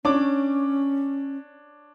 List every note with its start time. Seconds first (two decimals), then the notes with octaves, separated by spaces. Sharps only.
0.05 C#4 D4 C#5 D6